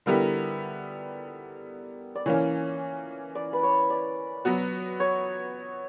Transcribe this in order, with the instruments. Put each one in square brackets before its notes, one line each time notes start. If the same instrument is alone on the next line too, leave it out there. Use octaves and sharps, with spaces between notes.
[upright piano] D3 G3 B3 E4 G4 [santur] A#4
[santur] D5
[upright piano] E3 A#3 C#4 [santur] C#5
[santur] D5
B4
C#5
D5
[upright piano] F#3 B3 F#4
[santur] C#5